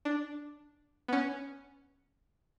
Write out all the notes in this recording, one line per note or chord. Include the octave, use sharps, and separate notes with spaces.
D4
B3
C#4